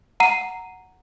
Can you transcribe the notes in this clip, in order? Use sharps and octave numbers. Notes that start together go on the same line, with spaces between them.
F#5 A#5 C7 D#7